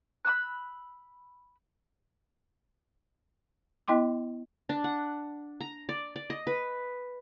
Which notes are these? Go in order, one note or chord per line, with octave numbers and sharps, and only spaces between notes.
B5 D#6 E6 F#6
B3 E4 D#5 G5 C6 D6
D4
F#5
A#5
D5
D5
D#5
B4